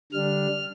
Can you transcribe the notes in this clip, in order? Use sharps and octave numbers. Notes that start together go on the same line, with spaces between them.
D3 G3 D4 F6